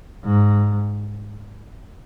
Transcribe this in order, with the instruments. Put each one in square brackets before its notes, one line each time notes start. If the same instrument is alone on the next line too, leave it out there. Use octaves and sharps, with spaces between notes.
[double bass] G#2